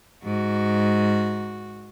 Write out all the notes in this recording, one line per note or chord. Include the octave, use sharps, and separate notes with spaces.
G#2 F#4